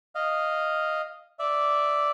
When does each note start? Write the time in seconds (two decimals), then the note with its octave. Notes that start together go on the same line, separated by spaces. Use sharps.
0.15 D#5 F5
1.39 D5 E5